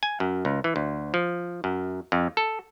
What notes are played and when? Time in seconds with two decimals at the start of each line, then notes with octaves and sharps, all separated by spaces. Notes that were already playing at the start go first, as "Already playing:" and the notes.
0.03 G#5
0.20 F#2
0.45 C#2
0.64 E3
0.76 D2
1.14 F3
1.64 F#2
2.12 F2
2.37 A4